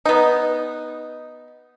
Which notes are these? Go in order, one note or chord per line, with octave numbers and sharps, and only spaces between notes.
B3 D#4